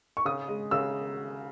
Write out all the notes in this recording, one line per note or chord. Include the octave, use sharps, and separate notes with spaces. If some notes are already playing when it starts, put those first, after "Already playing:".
C#6
C#3 D#6
G#3
C#3 E6